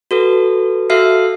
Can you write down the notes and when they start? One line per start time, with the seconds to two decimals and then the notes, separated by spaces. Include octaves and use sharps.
0.11 F#4 A4 B4
0.90 F#4 A4 E5 F5 F6 C7